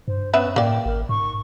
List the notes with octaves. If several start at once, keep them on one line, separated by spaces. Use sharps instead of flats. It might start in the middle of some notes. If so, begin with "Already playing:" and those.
G2 C5
B3 C#4 B4 E5
A2 A#3 D5 G5
G#1 A#4
G#2 C#6